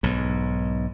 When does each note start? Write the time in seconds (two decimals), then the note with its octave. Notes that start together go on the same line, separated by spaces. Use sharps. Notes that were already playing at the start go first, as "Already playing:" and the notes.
0.03 B1 G#2